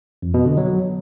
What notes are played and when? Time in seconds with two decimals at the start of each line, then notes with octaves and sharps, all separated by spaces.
0.22 F2
0.34 B2
0.46 D3
0.57 F#3